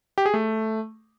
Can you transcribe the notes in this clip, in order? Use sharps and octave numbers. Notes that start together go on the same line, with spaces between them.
G4
G#4
A3